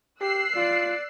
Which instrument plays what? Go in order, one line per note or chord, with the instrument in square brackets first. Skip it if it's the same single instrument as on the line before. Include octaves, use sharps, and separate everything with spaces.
[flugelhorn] G4 [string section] E6 F#6 C7
[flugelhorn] F4 [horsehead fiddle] D5